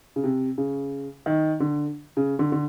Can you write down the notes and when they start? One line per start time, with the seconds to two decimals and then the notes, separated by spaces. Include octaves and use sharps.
0.16 C#3
0.24 C3
0.58 C#3
1.26 D#3
1.60 D3
2.17 C#3
2.39 D3
2.52 D3